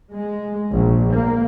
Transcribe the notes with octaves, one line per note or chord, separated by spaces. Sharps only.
G#3
A#1
A#3